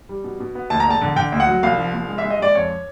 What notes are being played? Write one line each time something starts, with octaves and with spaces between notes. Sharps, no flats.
G3
B2
B2
B3
D2 A5
A#5
E1 A5
D3
D3 G5
D2
F#5
F#3
C2 F5
F3
C2
G#3
E5
G#3
D#5
G#3 D5
F2 C#5